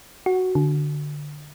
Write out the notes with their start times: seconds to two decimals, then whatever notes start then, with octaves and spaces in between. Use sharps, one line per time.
0.26 F#4
0.55 D3